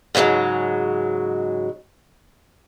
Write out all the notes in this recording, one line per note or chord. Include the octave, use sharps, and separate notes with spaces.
G#2 C#3 F3 F#3 G#3